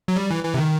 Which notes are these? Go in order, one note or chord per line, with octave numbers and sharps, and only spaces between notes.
F#3
G3
E3
E3
C3
D#3